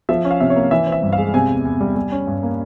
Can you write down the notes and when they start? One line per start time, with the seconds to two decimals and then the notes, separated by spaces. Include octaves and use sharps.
0.09 F3 E5
0.25 C#4
0.31 F5
0.40 C3 E5
0.50 C#5
0.56 A#3
0.71 E3 E5
0.87 C4
0.92 E5
1.03 G2
1.13 F5
1.18 G#3
1.34 C3 G#5
1.49 E2
1.65 E2
1.81 G3
1.96 G3
2.12 C#4
2.27 G2
2.43 A#3